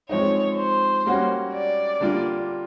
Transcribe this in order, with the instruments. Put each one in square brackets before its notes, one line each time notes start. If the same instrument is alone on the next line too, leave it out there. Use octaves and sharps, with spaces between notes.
[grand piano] F3 G#3 C4 D#4 [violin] C#5
[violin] C5
[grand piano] G3 A#3 C#4 F#4
[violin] D5
[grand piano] D3 G3 A#3 D4 F4